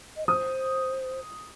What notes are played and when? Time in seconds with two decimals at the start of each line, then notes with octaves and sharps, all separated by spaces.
0.17 D#5
0.27 C5 D#6